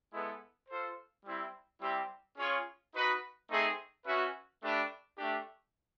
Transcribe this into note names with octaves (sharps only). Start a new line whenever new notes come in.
G#3 B3 E4 A4
F4 A4 C5
G3 C4 E4
G3 C4 E4 G4
C#4 F4 G#4 C#5
D#4 F#4 B4 D#5
A3 C4 D#4 G#4
C#4 F#4 B4 E5
A3 D4 G4 B4
A3 D4 G4